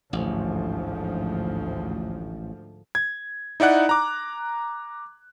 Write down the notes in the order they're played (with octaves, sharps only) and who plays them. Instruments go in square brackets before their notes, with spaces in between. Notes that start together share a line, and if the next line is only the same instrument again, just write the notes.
[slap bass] A1 [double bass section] D2 G#2 F3
[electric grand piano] G#6
D#4 E4 D5 F#5 F#6
A#5 D6